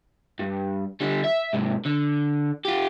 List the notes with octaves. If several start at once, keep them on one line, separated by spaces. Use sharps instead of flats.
G2
D3 G3
E5
G#2 C3
D3
F4 G4